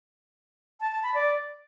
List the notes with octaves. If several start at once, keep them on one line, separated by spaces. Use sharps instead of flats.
A5
A5
B5
D5